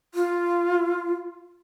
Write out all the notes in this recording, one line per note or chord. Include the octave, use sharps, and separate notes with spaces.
F4